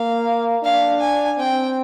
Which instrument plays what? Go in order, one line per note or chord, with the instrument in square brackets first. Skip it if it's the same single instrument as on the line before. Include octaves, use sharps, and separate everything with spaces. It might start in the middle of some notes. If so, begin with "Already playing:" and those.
Already playing: [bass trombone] A#3 [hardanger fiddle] F5
[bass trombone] D4 [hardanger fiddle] F5
[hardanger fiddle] G#5
[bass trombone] C4 [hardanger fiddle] G5